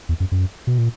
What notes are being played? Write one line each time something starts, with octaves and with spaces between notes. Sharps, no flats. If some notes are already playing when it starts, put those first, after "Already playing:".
E2
F#2
F#2
B2
A#2